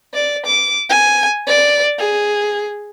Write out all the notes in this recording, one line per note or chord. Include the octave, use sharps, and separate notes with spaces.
D5
D6
G#5
D5
G#4